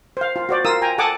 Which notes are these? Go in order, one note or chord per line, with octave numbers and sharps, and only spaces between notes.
C5 F5
F4
F#4 C5 D5
F4 A#4 D#6 E6
G5 G#5 A#5
A4 F#5 G#5 A5 D6 D#6